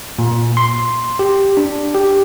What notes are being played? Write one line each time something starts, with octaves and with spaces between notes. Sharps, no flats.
A#2
C6
G4
D4
G4